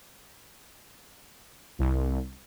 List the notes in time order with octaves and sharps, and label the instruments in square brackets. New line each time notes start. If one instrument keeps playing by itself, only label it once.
[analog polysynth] C2